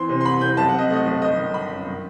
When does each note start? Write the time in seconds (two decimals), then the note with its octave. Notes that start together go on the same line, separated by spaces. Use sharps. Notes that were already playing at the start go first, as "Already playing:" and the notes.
Already playing: E3 C4 C6
0.09 C3
0.21 C6
0.25 C2 B5
0.41 C3 G6
0.57 B1 A5
0.68 F#5
0.73 C4
0.79 D#5
0.90 A3 D#5
1.06 B1
1.22 G1 D#5
1.38 D#3
1.54 G1 B5
1.71 F#2
1.87 D#3